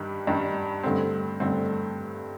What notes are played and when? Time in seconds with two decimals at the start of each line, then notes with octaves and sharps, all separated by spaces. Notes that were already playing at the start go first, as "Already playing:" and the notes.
Already playing: G2 D#3 G3 D4
0.27 G2 D#3 G3 D4
0.83 G2 D3 A3 C4
1.40 G2 D3 A3 C4